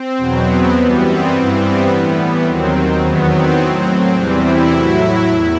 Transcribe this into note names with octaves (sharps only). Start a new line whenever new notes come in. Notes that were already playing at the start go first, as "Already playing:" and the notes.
Already playing: C4
E2 B2 F#3
B3
F#2 E3 G3
C4
G2 E3 G3
B3
A2 E3 G3
D#2 D#3 F#3 C4
E2 D#3 F#3 B3
C4
A2 F#3
C4
E2 C3 E3 G3
E4
A2 F#3 E4
E4
E2 E4